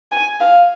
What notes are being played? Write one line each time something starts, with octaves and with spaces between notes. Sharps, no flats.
G#5
F5